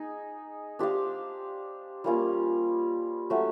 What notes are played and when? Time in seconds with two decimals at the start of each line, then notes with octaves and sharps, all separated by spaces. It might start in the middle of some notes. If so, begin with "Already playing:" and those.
Already playing: D#4 G#4
0.79 D4 G4 C5 F5
2.04 G3 A#3 C#4 F4
3.30 F#3 A3 C#4